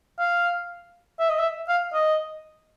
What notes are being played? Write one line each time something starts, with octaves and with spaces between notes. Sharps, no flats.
F5
E5
D#5
E5
F5
D#5